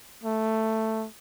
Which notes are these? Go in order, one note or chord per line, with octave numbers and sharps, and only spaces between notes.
A3